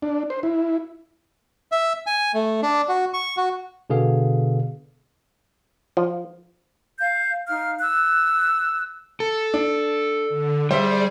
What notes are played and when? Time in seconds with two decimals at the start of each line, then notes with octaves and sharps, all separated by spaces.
0.02 D4
0.30 C5
0.43 E4
1.72 E5
2.07 G#5
2.34 A3
2.62 D4
2.89 F#4
3.14 C#6
3.37 F#4
3.90 B2 D3 B3 G#4 F5
5.97 F3
6.99 F5 G6
7.48 D#4 F5 F6
7.80 E6 F#6
9.20 A4
9.54 D4
10.29 D3
10.71 G3 G#4 C5 D5 E5